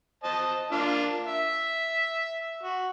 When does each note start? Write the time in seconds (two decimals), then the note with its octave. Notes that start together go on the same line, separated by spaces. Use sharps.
0.24 C5 D#5 A5
0.72 A#3 D4 F4
1.26 E5
2.63 F#4